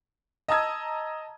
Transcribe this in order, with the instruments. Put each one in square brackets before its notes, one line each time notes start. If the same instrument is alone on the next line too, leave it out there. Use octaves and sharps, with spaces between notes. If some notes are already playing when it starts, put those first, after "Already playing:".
[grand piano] D#5 A5 A#5 D#6 E6 G#6